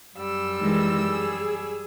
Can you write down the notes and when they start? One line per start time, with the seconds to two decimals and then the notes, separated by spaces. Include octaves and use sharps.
0.16 F#2 G3 E6
0.60 D#3 E3 G#3
1.03 G#4